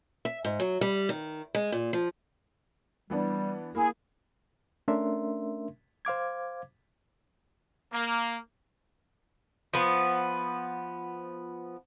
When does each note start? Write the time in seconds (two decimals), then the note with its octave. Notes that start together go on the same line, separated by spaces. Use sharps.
0.25 E5
0.45 G#2
0.60 F#3
0.81 G3
1.09 D#3
1.55 G#3
1.72 A#2
1.93 F3
3.10 E3 G3 B3 D4
3.75 A#3 E4 G#4
4.88 A3 C#4 D4 A#4 E5 C6
6.05 C5 F5 D6 G#6
7.93 A#3
9.73 F3 B3